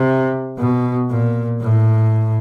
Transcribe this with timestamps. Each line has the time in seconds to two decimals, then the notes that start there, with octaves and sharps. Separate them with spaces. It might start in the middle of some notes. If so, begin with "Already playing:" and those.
Already playing: C3
0.59 B2
1.10 A#2
1.61 A2